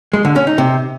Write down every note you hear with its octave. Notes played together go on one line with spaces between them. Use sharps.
G#3
D3
C#4
D#4
C3